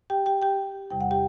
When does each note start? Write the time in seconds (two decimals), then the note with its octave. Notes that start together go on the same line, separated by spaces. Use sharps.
0.10 G4 G5
0.26 G4 G5
0.42 G4 G5
0.90 E2 C3 G3 G5
1.01 F#5
1.11 G4 G5